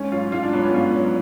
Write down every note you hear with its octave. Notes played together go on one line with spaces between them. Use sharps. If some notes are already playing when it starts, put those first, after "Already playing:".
Already playing: G#2 C#4
F#3 F4
G#2 F4
D4
F#3 B3
C#4
G#2 F4
F#3